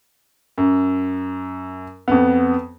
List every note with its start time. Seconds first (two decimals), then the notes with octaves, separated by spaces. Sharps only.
0.58 F#2
2.08 F2 B3